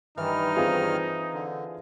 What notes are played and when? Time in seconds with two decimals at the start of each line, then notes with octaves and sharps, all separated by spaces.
0.18 G2 D#3 E3 D#4 F6
0.57 C4 F4 G#4
1.34 D3